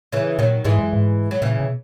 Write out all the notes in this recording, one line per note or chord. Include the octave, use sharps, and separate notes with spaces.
C#3 E3
A#2 D#3 F#3
G#2 E3 G#3
F#2
G#2
F#3
A#2 C#3 E3
B2